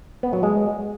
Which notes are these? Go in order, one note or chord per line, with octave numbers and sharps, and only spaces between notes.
B3
F#3
G#3